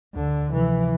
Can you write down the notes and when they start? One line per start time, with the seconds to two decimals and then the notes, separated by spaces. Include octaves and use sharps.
0.15 D2 D3
0.52 C3 E3 F3